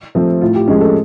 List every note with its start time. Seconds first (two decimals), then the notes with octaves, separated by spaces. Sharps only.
0.15 F3 A3 C4
0.41 A2 F4
0.55 G4
0.67 F3 G#3 C#4 G#4
0.81 A4